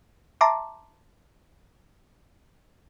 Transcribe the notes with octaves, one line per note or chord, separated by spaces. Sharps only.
E5 A5 A#5 C6 D6